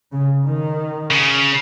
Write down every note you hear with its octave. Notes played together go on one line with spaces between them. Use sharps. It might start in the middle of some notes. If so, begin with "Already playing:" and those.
C#3
D#3
C#3